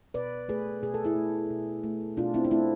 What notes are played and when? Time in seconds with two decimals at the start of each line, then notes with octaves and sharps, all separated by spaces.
0.14 B2 B4 D5
0.48 A3 G#4 B4
0.82 B2 G#4
0.94 A4
1.04 E4 G#4
1.16 A3
1.50 B2
1.83 A3
2.17 B2 D4 F4
2.34 C4 E4
2.45 D4
2.51 A3 C4 E4